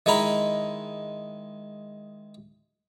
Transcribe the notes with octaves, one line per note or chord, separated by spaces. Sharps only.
D#3 G#3 E4 A#5 B5